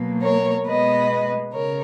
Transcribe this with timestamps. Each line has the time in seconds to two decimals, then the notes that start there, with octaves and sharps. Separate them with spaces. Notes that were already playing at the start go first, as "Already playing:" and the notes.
Already playing: B2 F#3 A#3
0.23 A#4 C#5
0.66 B2 G#3 B3 B4 D#5
1.53 C#3 A#4 C#5